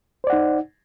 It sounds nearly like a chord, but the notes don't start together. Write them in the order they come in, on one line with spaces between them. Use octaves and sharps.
C5 D5 F#5 D#4